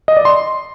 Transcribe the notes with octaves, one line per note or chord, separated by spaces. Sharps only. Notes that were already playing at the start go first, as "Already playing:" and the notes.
D#5
D5
C6